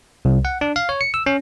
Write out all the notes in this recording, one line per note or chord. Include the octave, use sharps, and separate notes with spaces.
C2
F#5
D4
F5
C#5
C#7
E6
C#4